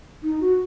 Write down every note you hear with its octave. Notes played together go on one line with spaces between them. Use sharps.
D#4
F#4